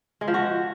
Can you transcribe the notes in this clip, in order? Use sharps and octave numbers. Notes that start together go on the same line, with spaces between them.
G#3
F3
F#4